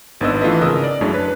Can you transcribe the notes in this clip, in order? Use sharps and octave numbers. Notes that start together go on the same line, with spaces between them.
G#1 B3 D4 B4 D#5 E6
E3 A3 F4 A4 B4 D#5
G#1 C#3 A#4 D#5 D#6 E6
D5
F#2 G#3 A3 D4 E4 C#5
B4